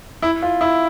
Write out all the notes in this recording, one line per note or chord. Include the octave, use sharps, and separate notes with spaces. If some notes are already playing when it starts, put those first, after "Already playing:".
E4
F4
E4